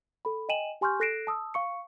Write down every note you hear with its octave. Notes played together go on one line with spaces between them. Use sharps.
A4 B5
D#5 G5 G#5 D#7 E7 F#7
G4 G#5 C6 C#6 F6 G6
A4 F#6 A#6 C7 D7 E7
A5 D#6 E6
F5 C#6 C#7